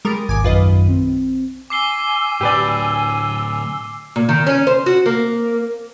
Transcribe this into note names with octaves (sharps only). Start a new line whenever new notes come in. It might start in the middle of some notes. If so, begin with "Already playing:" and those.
G3 G#3 A#4 D#6 A6
G#1 D#2 D#3 G#5 D6
A#1 F#2 D#3 F4 B4 D#5
C4
G#5 D6 E6 C7 G7
A2 D3 G4 B4 D5
A#2
D#3
C#4
C5
F#4
A#3